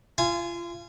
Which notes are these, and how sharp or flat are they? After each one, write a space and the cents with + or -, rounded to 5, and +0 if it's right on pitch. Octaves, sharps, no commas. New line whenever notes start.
F4 -30 G#5 +0